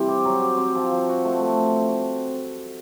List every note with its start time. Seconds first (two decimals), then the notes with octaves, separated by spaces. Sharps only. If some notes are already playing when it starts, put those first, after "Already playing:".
Already playing: C3 E3 G3 C4
0.09 G4
0.25 F#3
0.42 G4
0.58 C4
0.76 F3
0.91 F3
1.09 F#4
1.25 A3
1.42 A3